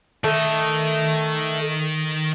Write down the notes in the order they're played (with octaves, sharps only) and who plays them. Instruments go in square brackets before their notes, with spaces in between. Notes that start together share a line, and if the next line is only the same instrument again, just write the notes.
[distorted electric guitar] D#3 D#5 [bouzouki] A3